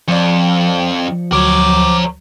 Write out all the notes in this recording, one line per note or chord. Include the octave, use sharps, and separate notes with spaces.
F2 F3 D5 C#7
D2 F#3 A#4 C#5 D6